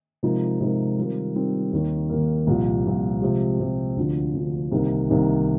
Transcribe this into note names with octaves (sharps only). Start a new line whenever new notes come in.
C3 F3 G#3 D#4 A#4
C3 F3 G#3 D#4 A#4
D#3 G3 C4 F4 A#4
D#3 G3 C4 F4 A#4
D#2 D#3 A#3
D#2 D#3 A#3
C2 A#2 F3
C2 A#2 F3
C3 F3 G#3 C4 G4
C3 F3 G#3 C4 G4
D2 D3 F3
D2 D3 F3
C2 C3 D#3 A#3 D#4
C2 C3 D#3 A#3 D#4